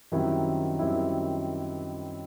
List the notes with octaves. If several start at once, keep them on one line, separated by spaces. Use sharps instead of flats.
F#2 D#3 G3 C4 E4
F#2 D#3 G3 C4 E4